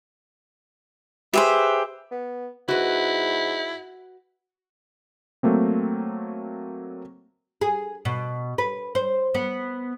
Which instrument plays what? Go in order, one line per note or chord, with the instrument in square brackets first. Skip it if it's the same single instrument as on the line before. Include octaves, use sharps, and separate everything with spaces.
[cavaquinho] G4 G#4 C5 [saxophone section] B4 E5
[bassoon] B3
[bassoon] G#2 [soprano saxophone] E4 [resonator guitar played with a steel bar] F#4 B4
[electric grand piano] F#3 A3 A#3 C4
[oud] G#4
B2
B4
C5
B3